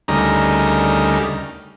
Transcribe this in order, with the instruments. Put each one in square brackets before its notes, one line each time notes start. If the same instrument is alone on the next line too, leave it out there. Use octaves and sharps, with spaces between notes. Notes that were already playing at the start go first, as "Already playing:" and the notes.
[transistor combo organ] D2 C#3 G3 D#4 A#4